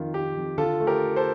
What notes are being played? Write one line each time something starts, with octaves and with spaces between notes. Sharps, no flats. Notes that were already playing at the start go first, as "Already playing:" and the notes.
Already playing: F2 D#3 F4
D#3 G4
F2
D3 F4 A4
A3
G4 A#4
A3
A4 C5